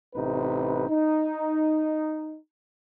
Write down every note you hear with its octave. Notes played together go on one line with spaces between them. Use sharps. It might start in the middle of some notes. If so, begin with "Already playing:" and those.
A1 C3 D#4 B4
D#4